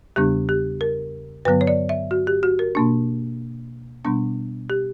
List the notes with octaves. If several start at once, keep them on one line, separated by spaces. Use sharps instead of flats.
E2 C#3 G3 B3 D4 G4
G4
A#4
G2 D3 F#3 B3 B4
C#5
D5
E5
F#4
G4
F#4
A#4
B2 A#3 D4
B2 G3 B3 D4
G4